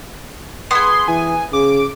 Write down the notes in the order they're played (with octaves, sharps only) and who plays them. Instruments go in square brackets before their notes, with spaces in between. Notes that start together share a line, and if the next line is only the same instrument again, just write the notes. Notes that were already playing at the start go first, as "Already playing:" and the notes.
[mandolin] B3 G#4 [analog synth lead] C6
[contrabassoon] E3 [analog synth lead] G#5
[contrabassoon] C#3 [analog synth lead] D6